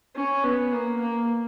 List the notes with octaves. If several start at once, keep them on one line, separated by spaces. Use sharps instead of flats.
C#4
B3
A#3
A#3